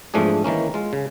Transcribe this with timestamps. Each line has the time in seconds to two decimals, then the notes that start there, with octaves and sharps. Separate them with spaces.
0.14 E2 G#2 F3 A3 D4 G#4
0.44 D#3 E3 A#3 C#4
0.74 G#3 F4
0.93 C#3